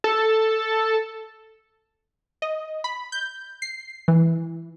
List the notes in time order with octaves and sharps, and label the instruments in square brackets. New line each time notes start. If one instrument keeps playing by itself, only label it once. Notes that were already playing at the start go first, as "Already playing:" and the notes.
[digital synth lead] A4
[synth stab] D#5
B5
G6
C7
E3